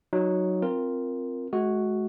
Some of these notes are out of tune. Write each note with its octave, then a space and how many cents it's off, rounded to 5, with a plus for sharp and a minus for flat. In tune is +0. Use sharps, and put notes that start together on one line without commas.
F#3 +0 D#4 +0
C4 +0 F4 +0 A#4 +0
G#3 +40 F#4 +0